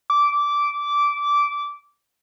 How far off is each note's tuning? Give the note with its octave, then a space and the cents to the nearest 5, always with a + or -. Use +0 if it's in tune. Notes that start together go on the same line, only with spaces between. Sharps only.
D6 -15